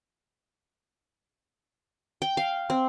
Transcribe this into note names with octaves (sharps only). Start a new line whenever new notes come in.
G5
F5
C4